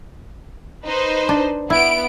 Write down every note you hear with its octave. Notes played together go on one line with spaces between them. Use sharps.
D#4 B4 C5
D4
B3 E4 D7